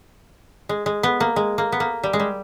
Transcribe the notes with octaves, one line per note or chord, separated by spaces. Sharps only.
G#3
G#3
B3
A#3
G#3
A#3
B3
A#3
G3
G#3
G3